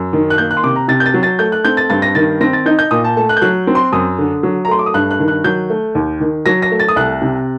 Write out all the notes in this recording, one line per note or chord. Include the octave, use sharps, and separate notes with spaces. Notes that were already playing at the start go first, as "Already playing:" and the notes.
Already playing: F#2
D#3
F#6
A#3 G6
F#6
C6
C3 D6
A#5
C3 A6
G6
A6
F#3
A6
A3 G6
F#6
C4 G6
A6
G2 A6
A#6
D#3 A6
C4 A#6
A6
D#4 G6
G6
A#2 D#6
A5
A3 A5
F#6
G6
F#3 F#6
C4
C6
F#2 D#6
D3
F#3
A#5
A3 C6
D6
D#6
G2 F#6
F#6
D#3
F#6
F#3 G6
A3
D#2
D#3
F#3 A#6
A#6
A3
A6
D#6
C2 F#6
C3